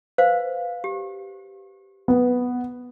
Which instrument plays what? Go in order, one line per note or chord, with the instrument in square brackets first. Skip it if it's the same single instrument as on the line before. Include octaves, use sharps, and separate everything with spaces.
[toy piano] B4 C5 F5
G4
[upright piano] B3